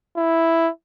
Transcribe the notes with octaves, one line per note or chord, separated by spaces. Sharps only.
E4